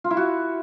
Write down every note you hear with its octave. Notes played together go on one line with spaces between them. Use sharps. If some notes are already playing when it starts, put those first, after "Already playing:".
F4
E4
F#4